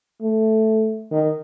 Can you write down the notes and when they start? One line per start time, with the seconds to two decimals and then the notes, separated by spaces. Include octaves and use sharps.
0.21 A3
1.12 D#3